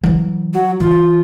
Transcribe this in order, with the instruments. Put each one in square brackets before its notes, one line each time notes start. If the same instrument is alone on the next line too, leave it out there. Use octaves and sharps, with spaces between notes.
[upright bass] E3 F#3
[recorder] F#3
[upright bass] E3 [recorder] F4